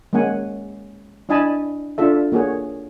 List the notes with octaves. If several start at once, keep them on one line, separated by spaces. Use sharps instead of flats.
G#3 A#3 C#4 F#5 G#5
D4 E4 D#5 G#5 A5 B5
D4 F4 A4 E5
A#3 F#4 G#4 C#5